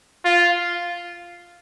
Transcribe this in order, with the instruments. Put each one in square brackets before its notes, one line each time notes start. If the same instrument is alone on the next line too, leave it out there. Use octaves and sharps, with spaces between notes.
[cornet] F4